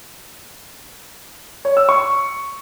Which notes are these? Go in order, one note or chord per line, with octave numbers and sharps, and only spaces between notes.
C#5
E6
C#6